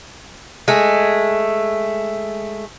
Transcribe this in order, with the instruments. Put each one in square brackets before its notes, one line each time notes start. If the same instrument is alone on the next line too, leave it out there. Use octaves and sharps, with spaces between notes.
[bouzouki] G#3 A3